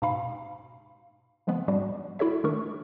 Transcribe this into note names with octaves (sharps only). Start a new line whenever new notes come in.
G#2 B2 F5 B5 C7
C#3 F3 G#3 B3 C4
G#2 G3 D4 F#4 D5
E4 F#4 A4 C#5 E5
D#3 A3 D4 A#4 C#6